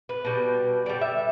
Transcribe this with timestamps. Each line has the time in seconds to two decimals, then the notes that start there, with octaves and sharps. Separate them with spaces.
0.09 B4
0.25 B2 G3
0.86 D3 G3 D5
1.01 E5